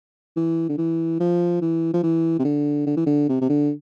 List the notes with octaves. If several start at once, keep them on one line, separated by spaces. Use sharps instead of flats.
E3
D3
E3
F3
E3
F3
E3
C3
D3
D3
E3
D3
C3
C3
D3